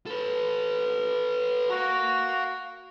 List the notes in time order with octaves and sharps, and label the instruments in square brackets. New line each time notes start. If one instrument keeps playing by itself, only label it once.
[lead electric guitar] A4 B4
[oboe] F#4 [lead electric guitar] F5 A#5